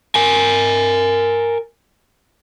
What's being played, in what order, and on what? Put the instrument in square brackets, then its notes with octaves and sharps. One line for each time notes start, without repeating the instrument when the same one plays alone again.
[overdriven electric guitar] A#4 G#5